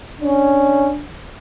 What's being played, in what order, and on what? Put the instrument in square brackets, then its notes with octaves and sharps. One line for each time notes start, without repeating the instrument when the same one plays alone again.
[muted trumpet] C#4 [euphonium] D4